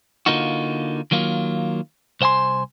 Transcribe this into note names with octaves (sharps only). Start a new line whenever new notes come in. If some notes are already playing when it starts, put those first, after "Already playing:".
D3 A#3 D#4 F4 F#4
D#3 F#3 A#3 F4
C2 C5 F#5 G#5 C6